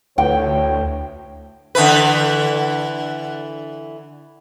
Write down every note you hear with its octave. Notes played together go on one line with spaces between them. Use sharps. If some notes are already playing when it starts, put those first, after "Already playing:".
D2 A2 C#5 G5
D3 E3 B4